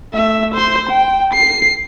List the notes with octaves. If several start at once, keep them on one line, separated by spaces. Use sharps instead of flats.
A3 E5
C5 C6
G5
C7